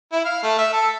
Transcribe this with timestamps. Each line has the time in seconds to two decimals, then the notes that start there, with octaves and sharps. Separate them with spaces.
0.13 E4
0.25 F5
0.43 A3
0.58 E5
0.73 A4